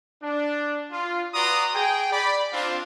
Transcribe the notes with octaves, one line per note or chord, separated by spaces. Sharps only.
D4
F4
F#4 B4 D5 A#5 C6 D#6
G#4 G5
D5 B5
C4 D4 F4